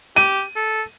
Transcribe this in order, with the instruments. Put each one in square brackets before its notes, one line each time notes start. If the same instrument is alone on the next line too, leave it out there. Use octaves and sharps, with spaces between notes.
[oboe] G4 [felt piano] D#7
[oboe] A4